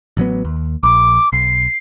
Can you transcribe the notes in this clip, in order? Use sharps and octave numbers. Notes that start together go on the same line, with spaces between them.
A1 F#3 B3
D#2
A#1 D6
B1 C7